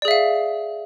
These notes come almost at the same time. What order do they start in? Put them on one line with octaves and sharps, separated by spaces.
D5 G#4 E5 F5